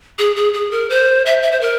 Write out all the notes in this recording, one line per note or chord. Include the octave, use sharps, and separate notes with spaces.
G#4
G#4
G#4
A#4
C5
E5
E5
C5
A#4